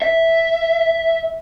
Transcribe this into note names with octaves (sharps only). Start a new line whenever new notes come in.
E5